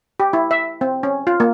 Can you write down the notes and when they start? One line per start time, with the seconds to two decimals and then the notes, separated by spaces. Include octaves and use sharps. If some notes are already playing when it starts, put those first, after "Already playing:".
0.20 G4
0.33 E4
0.51 E5
0.81 C4
1.03 C#4
1.27 F4
1.40 A#3